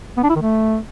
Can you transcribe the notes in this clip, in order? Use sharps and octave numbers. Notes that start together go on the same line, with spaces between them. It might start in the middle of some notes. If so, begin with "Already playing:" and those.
B3
D4
E4
D#3
A3